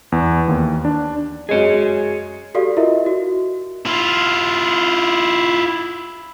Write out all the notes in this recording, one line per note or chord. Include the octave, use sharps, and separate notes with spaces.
E2
D#2
D4
F#2 G#3 G#4 C#5 D#5
F#4 G4 A4 D5 F5
E4 F4 A#4 D#5 E5
F#4
E4 F4